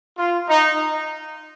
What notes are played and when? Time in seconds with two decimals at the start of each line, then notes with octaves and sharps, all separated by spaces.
0.18 F4
0.50 D#4